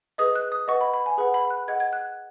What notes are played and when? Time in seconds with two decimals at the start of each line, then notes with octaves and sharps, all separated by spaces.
0.18 G#4 B4 D#5 D#6
0.36 F#6
0.52 D#6
0.68 B4 D#5 F#5 C#6
0.81 B5
0.94 B5
1.06 G#5
1.18 G#4 B4 F#5 B5
1.34 B5
1.50 F#6
1.68 G#4 D#5 F#5 G#6
1.80 G#6
1.93 F#6